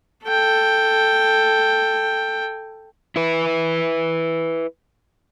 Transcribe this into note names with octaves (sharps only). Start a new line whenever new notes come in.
A4 G5
E4 B4